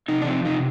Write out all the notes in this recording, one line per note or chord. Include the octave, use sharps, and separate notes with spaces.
C3 D#4
D4
F3 C4
C3 D#4